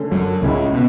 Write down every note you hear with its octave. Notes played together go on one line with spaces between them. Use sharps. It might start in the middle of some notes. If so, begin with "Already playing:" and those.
Already playing: D3 A3 C#4
F#2 F#3
C#2 A2 C#3 G#3 C#4 E4
B2